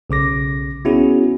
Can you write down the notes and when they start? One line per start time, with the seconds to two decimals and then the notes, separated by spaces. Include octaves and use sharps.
0.10 B1 C#3 D6 A#6
0.85 B3 C#4 E4 F#4 G#4